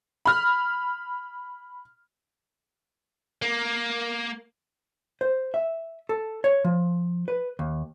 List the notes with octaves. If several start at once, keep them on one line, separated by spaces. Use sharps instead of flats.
B5 F6
A#3
C5
E5
A4
C#5
F3
B4
D#2